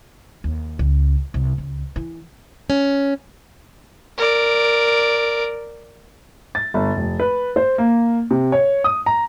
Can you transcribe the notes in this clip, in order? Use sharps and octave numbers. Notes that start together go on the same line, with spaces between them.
D#2
C#2
C2
C#2
E3
C#4
A#4 D5
A6
G1
F1
B4
C5
A#3
C3
C#5
D#6
A#5